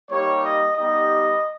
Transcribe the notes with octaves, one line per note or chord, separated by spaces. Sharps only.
G3 A#3 D#4 G4 C#5
D#5
G3 B3 D#4 G4 D#5